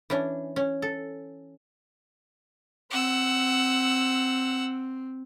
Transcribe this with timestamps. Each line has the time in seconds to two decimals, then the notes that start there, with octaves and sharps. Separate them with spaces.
0.10 E3 C#4 D4
0.56 C#4
0.82 A4
2.91 C4 F#5 E6